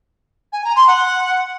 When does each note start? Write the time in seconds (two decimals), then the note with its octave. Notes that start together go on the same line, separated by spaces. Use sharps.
0.52 G#5
0.64 A#5
0.76 C6
0.87 F#5